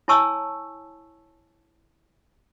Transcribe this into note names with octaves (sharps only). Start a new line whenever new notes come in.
E4 C#5 G#5 A5 C#6 E6